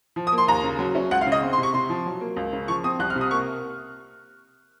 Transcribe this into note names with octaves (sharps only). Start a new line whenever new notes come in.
F3
D#6
A#3
C6
D#2 A#5
C#3
F#3
C#4
C#2 F#5
F5
C#3
D#5
C4
C6
C3
C#6
C3 C6
F3
F#3
A#3
C#2
C#3
F3 C#6
C4 D#6
C2 F#6
F6
C3
D#6
A#3 C#6